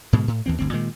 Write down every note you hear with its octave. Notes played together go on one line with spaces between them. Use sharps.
G#2 B2 D3 G#3
A2
D#2 E3 C4
G1 D2 C4
A#2 D#3 G#3